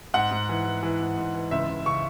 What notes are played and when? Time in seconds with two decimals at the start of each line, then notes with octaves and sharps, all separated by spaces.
0.14 G#2 F#5
0.31 G#2
0.49 E3
0.65 E3
0.83 E3
1.01 G#2
1.17 G#2
1.34 E3
1.51 C#2 E5
1.69 C#2
1.86 C#3 C#6